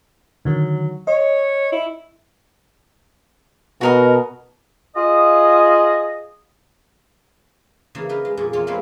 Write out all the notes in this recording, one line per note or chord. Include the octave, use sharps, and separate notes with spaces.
D3 D#3 F#3
C#5 D#5
E4
B2 F#4 A#4 D#5
F4 G#4 D#5
C#3 E3 A#3
D#4 A#4 B4
G#3
F2 A#2 G#4
E2 A#3 F4 C#5
G#3 A#3 C4 B4 C#5